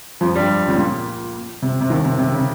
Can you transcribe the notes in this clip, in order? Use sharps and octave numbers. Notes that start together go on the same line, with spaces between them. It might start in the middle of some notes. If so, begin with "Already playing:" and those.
F2 F3
G2 G3
C#2 C#3
A#2
C3
C3
D#2 D#3
C3
C3
C#3